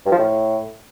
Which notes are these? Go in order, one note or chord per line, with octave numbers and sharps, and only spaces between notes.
G2
F3
A2